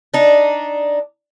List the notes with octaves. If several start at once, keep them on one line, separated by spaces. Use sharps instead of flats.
D4 D#4